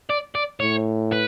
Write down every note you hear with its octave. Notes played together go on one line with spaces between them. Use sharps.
D5
D5
A2 C#5
B4